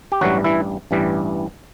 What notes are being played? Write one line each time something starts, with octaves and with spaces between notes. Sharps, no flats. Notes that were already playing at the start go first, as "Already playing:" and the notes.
G4
A1 G2 E3 F#3 G3 F#4
E3 E4
A1 G2 E3 G3